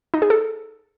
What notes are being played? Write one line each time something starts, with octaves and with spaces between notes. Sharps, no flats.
D#4
G#4
A4